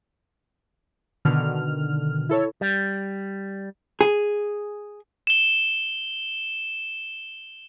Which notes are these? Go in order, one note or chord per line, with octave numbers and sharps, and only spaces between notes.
B2 D3 D#3 F6
E4 A4 C#5
G3
G#4
E7 G7